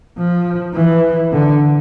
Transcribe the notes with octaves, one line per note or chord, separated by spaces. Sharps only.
F3
E3
D3